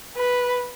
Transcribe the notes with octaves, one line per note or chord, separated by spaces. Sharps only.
B4